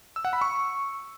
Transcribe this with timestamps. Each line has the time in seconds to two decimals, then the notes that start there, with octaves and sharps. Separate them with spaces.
0.16 E6
0.25 F#5
0.33 B5
0.41 C#6